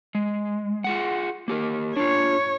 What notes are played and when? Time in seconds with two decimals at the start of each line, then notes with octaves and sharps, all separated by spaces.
0.15 G#3
0.84 F4 G#4 F#5
1.48 A#3 G4 A#4
1.97 D4 F4 C#5